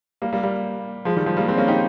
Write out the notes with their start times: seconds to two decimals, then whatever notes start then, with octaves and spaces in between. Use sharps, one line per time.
0.22 G3 A#3
0.33 G3 A#3
0.43 G3 A#3
1.05 F3 G#3
1.17 D#3 G3
1.26 F3 G#3
1.37 G3 A#3
1.48 G#3 C4
1.58 A#3 C#4
1.68 D#4 G4